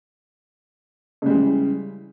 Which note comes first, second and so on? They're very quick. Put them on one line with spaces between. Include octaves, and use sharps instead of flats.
C#3 G3 G#3 E3